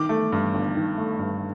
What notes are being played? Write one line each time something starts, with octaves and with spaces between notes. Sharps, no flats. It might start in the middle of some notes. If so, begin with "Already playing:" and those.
Already playing: D#3 D6
A3
G2
G1
D#3
A3
G2